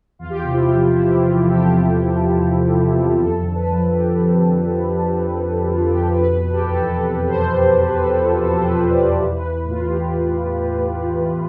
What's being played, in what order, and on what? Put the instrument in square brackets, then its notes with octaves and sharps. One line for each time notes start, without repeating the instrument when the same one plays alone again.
[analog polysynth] E2 F4
G4
C3 F4
E4
F4
F3
E2 E4
E2 F4
C3 A4
G4
F4
F3 G4
E2
E2
C3
F3
E2
F2 A4
D3
B4
F3
F2 G4
F2
D3
F3
F2
F2
D3
F3 F4
F2 G4
B2 B4
B2
A4
G4
E2
A4
E2 A4
B2
C5
B2
E2 C5
B4
E2
A4
B2
F4
B2 A4
C5
E2 B4
E2 D5
E3
B4
E3
A2
F4
A2 G4
E3
E3
A2
A2
E3